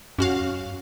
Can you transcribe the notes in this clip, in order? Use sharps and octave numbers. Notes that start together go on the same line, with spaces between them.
F#2 C#4 F#4 F5